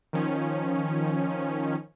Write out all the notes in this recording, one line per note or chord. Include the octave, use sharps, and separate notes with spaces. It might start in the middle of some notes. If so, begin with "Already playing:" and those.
D#3 F3 C#4